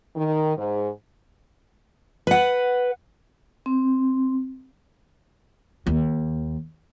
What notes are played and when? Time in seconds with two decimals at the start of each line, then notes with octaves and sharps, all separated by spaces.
0.17 D#3
0.58 G#2
2.27 B4 F#5
3.66 C4
5.87 D#2